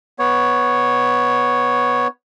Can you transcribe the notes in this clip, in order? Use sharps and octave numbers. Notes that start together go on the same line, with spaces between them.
B3 C#5